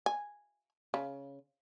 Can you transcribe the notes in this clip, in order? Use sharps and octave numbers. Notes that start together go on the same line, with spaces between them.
G#5
C#3